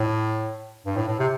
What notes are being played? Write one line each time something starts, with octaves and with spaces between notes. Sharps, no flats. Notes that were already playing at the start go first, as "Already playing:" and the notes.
Already playing: A2
G2
A2
A2
C3